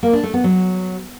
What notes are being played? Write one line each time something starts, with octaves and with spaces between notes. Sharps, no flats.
A#3
D4
A3
B3
F#3